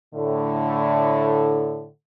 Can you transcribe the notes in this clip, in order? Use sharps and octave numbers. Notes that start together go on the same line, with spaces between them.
A2 D3